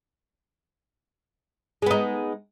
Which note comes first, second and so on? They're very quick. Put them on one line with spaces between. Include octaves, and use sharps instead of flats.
G#3 B3 D#4